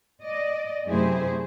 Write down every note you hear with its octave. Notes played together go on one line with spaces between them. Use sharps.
D5 D#5
F#2 C3 A3 E4 G#4 C5